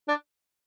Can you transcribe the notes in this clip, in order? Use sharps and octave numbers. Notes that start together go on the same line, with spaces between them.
D4